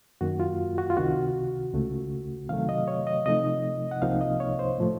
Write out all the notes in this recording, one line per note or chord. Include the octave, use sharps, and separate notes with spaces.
F#2 D#3 A#3 F#4
F4
F#4
F4
C#2 C3 D#3 F#4
C#2 C#3 A3
C3 D#3 F#3 A3 F5
D#5
C#5
D#5
C3 F3 A3 D#4 D#5
F#5
C2 C3 F3 A#3 D#4 F5
D#5
C#5
C5
A2 F3 A3